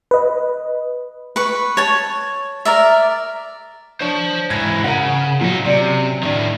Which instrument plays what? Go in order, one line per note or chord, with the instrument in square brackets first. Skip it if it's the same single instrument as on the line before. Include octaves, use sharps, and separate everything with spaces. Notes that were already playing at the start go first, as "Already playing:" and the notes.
[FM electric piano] B4 D#5
[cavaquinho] B4 C#6
C#5 A5
A#4 D5 E5
[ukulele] D4 C#5 [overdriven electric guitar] C5 A5
[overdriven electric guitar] G#2 E3 [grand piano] G#6 A#6
[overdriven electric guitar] C#3 [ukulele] A#4 C#5 F#5
[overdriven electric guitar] A#2 D#4 [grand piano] F#3
[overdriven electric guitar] C3 [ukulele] C#4 D5
[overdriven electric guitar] A2 D#3 [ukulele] D4